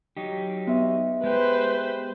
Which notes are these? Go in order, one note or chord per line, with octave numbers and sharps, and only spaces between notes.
F#3 D#4 G4
B3 E5
G#3 G4 B4 C5